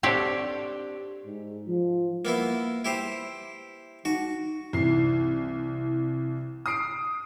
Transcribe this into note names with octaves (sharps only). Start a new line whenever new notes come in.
C4 D4 G4 A4 C#5
G#2
F3
A#3 B3 E4
E4 G4 C5
D#4 F#4
C2 E3 C7
D#6 C7 D7